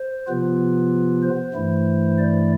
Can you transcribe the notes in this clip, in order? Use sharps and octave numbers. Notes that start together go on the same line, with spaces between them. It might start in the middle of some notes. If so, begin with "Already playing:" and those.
Already playing: C5
C3 F3 B3 F4 B4
C5
G2 E3 A3 E4
D5